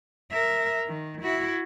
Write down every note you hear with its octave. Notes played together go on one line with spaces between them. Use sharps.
A#4 E5
D#3
E4 F#4